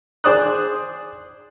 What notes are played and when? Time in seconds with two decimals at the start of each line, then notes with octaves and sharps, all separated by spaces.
0.24 G#4 C5 D5 D#6 F#6